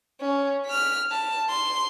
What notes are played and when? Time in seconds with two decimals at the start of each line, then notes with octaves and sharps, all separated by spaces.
0.21 C#4
0.66 F6 B6
1.11 A5
1.49 C6